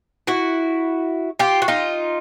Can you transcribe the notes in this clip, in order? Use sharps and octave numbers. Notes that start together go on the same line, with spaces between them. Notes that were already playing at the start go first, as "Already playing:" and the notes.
E4 F#4
F4 G4
F#4
D#4 F4